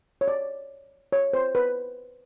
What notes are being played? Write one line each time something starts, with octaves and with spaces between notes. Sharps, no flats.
C#5
D5
C#5
C5
B4